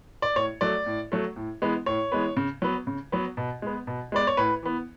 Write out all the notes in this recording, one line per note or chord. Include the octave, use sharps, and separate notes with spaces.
D5
A2 C#5
F#3 A3 D5
A2
F#3 A3
A2
E3 G#3 B3
A2 C#5
E3 G#3 B3
C#3
F#3 B3
C#3
F#3 B3
B2
G#3 B3
B2
G#3 B3 D5
C#5
A2 B4
E3 B3